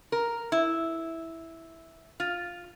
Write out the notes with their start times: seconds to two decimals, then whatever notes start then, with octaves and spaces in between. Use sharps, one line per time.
0.12 A#4
0.52 E4
2.20 F4